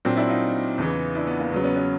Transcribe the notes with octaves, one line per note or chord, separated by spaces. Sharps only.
A#2 F#3 C4 D4
D4 E4
D#4 F4
E2 C#3 E3
D4 E4
B3
A#3
E2 C#3 F#3 B3
B3 C#4
B3 C#4